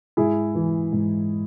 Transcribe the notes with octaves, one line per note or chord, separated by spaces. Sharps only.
G#2 E4 G#4
E3
G#2